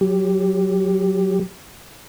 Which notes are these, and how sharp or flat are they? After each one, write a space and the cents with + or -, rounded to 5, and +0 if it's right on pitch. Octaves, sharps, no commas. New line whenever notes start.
F#3 +0 G4 +0